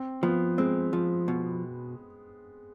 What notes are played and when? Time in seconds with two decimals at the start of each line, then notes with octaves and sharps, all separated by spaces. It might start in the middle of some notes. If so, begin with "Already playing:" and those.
Already playing: C4
0.23 F3 B3
0.58 G#3 C4
0.93 F3
1.28 B2